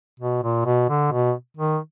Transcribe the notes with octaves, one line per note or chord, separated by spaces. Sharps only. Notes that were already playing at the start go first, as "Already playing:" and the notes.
B2
A#2
B2
D3
B2
D#3